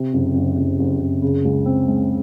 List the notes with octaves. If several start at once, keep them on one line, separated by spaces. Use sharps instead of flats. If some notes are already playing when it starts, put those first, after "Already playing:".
Already playing: C3
F#1
F#1
F#1
F#1
F#1
C#3
C#2
C4
G#3